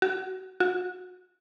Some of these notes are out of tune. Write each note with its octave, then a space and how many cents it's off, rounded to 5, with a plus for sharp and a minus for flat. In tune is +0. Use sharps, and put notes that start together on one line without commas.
F#4 +30
F#4 -30